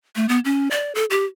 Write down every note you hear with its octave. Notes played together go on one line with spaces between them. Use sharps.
A3
B3
C#4
D5
A4
G4